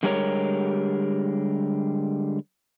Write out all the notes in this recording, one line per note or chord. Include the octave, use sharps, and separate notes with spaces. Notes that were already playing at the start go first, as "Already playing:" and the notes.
D3 G3 G#3 G4 A#4 C#5